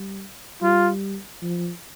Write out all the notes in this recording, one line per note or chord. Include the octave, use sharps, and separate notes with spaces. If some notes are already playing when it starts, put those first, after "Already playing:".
Already playing: G3
G3 F4
F3